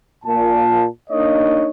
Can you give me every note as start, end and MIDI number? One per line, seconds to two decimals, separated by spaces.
0.25 0.85 46
0.25 0.85 81
1.10 1.70 58
1.10 1.70 62
1.10 1.70 63
1.10 1.70 73
1.10 1.70 75